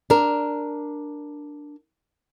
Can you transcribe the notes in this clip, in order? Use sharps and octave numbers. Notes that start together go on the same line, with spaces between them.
D4 A#4